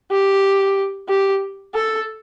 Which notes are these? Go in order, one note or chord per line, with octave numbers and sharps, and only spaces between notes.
G4
G4
A4